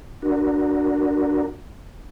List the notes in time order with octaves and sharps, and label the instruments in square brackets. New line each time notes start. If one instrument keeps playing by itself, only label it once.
[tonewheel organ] D4 F#4 A#4